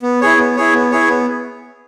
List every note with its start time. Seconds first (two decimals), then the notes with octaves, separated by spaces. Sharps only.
0.02 B3
0.21 E4 G#4 C#5
0.38 B3
0.56 E4 G#4 C#5
0.74 B3
0.91 E4 G#4 C#5
1.08 B3